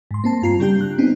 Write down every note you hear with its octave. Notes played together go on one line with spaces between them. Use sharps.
G#2 C6
A#3 C4 A5
G2 F4 A#5 C7
C#3 G3 D4 G4 G6
F#6
B3 C4 D4 D#4